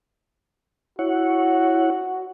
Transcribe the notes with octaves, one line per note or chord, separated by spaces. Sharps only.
E4 F#4 C#5 F#5